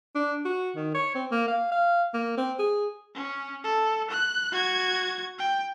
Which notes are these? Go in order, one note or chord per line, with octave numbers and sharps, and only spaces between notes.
D4
F#4
D#3
C#5
C4
A#3
F5
F5
A#3
C4
G#4
C#4
A4
F#6
F#4 G#6
G5